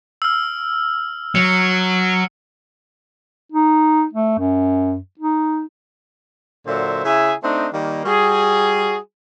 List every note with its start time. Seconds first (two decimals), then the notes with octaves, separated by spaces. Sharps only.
0.22 E6 F6
1.35 F#3 C#7
3.52 D#4
4.13 A3
4.38 F#2
5.19 D#4
6.66 A#2 D3 F#3 C5 E5
7.05 C#3 E4 G#4 E5 G#5
7.44 A3 C4 D4 D#4
7.73 D#3 G3 A#3
8.06 G3 F#4 G#4